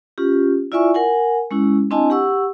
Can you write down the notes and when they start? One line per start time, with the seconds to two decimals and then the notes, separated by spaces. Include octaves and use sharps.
0.18 C#4 F4 G4
0.72 E4 F4 D5 E5 G#5 C#6
0.94 A#4 F#5 G#5
1.51 G#3 C#4 E4
1.91 C4 D4 E4 D#5 G#5 A5
2.10 G4 F#5 C#6 E6